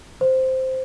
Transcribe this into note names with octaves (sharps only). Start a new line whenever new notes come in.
C5